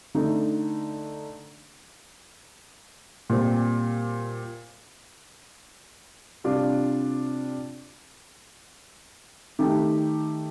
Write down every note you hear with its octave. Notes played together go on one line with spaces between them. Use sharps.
D3 A3 D#4
A#2 G3 C4 G4
C3 G3 D4 F4
D#3 A3 D#4 G4